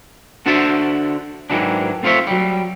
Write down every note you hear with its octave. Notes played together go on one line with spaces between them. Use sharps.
D3 D4 F#4 C5 E5 A5
G#2 D#3 E3 F#3 D4
A3 C4 F4 C5 C#5 E5
F#3 G3